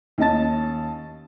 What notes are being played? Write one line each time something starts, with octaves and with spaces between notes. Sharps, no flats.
D#2 C#4 D#5 A5 A6